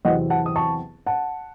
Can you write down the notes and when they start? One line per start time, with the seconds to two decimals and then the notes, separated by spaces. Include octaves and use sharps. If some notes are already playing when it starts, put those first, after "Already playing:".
0.05 E2 C3 F#3 C4 E4 D#5 F#5
0.30 F#5 A5
0.46 D#6
0.56 A5 C#6
1.06 F#5 A5